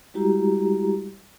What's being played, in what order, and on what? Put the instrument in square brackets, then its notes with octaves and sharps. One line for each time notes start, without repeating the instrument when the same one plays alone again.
[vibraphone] G3 G#3 E4 F#4 G4 A#5